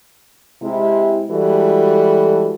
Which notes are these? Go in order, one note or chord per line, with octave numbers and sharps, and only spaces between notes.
C3 G#3 E4
E3 G3 G#3 F#4 A4